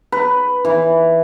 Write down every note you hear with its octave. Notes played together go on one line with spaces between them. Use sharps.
B4
E3